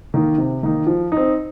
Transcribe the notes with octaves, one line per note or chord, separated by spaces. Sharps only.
D#3 A#3 D#4
C3
D#3 A#3 D#4
F3
D#4
C4